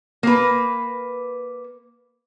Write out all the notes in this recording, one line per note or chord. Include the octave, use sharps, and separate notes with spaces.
A#3 B4